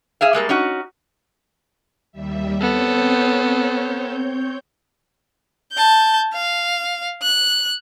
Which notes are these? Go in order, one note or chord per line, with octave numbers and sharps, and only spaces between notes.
G#4 E5 F5
G3 G#3 A#3 A4
C#4 D#4 F#4
D#2 G3 E5
B3 C4 A4 C#5 G6
A5 G6
F5
F#6